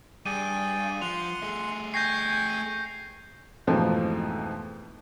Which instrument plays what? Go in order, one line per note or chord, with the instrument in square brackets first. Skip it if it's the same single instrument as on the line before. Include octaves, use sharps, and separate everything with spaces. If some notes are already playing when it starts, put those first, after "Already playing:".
[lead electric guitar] G2 [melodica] G#4 D5 G5 [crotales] D#7
[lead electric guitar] F3 [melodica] F#5 C6 [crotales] F7
[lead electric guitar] A3 G#4
[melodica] G5 G#5 C#6 [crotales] G6 A#6 C7
[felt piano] F2 G#2 B2 E3 F3 A3